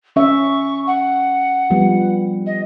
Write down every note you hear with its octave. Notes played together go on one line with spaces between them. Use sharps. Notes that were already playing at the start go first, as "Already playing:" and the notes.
C#4 E5 C#6
F#5
F3 G3 B3
D#5